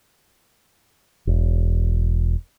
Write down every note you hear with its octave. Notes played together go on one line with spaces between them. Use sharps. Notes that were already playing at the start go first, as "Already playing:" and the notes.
E1